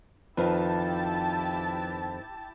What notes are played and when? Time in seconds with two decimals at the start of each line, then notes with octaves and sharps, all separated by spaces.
0.37 F2 D#3 F3 E4 G4 B4 A5